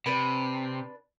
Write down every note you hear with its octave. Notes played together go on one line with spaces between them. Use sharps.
C3 D4 B4 B5